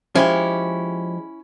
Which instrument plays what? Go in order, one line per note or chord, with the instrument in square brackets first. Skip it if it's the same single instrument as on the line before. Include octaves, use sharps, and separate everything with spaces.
[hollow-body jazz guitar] F3 G#3 G4 [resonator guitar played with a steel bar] C#4 E4